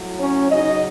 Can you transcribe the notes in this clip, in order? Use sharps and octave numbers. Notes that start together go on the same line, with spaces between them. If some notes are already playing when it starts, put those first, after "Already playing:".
Already playing: A2 F#3
C#4 C#5
C#3 F#3 D#4 D#5